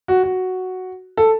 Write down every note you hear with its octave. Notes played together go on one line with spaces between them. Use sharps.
F#4
F#4
A4